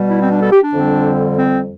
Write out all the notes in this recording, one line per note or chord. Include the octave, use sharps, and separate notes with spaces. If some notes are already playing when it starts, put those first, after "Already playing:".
Already playing: B2 G3
E4
C4
D4
A4
G4
D4
F2 D3 G3 C4
C4